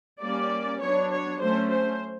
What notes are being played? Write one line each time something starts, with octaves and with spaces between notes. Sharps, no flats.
G3 A#3 C#4 D5
F#3 B3 D4 C#5
C#5
F#3 A3 C#4 C5
C5